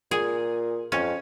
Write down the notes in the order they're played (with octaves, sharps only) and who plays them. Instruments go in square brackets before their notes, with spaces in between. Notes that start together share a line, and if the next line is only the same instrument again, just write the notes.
[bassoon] A#2 [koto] G#4
[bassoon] F2 [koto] C#4